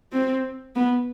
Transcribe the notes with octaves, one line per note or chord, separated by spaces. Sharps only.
C4
B3